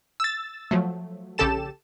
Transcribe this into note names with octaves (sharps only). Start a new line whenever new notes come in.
E6 A6
F3 F#3 A3
A#1 C#3 G4 A4 A5 E7